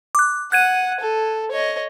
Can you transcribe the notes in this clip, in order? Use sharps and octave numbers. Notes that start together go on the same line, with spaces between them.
D6 F#6
F#5 F#6 G#6 D#7
A4
C#5 D#5